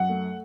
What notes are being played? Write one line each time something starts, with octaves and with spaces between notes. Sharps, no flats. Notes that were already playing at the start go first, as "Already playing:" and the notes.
Already playing: F#2 F#5
A3